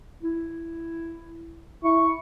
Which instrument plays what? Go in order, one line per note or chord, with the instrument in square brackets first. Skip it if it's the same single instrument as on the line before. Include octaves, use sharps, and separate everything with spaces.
[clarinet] E4
[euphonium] E4 [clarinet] C#6